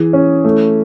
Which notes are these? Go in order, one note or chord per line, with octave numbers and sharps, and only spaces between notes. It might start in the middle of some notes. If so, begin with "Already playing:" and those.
Already playing: E3 G#4
C#4
A3